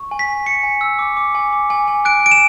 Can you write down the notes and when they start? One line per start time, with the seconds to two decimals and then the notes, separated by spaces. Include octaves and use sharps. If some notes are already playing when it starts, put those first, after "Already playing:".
Already playing: C#6
0.11 G#5
0.19 B6
0.28 G#5
0.46 G#5 C#7
0.63 G#5
0.81 E6
0.99 D6
1.17 D6
1.35 G#5
1.53 D6
1.70 G#5
1.88 G#5
2.05 F#6 D7
2.23 G#5 D7
2.31 E7